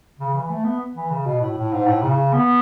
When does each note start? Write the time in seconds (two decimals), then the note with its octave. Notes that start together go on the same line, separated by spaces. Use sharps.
0.19 C#3
0.34 E3
0.50 A3
0.64 B3
0.95 E3
1.10 C#3
1.26 B2
1.41 A2
1.57 A2
1.73 G#2
1.87 A2
2.02 C#3
2.33 B3